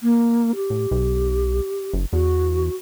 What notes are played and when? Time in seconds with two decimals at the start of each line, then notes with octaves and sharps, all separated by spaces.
0.01 A#3
0.55 G4
0.70 A2
0.91 B1
1.93 F#1
2.13 E2 F#4